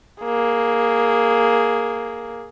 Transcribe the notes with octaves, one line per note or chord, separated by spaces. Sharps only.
A#3 G#4